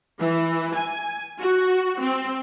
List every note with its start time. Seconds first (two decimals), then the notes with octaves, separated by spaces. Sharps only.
0.19 E3
0.74 G#5
1.39 F#4
1.99 C4